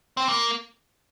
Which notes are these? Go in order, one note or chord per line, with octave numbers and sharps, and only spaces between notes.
C4
A#3